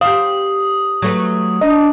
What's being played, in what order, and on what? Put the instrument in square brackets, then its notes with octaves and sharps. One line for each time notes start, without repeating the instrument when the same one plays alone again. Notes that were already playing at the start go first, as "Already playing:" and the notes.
[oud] G4 C5 [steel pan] F5 [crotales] D#6
[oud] F#3 A3 B4
[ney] D4 [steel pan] D#5